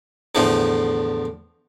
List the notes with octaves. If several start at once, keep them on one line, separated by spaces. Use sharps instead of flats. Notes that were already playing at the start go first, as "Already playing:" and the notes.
E2 A2 D3 F3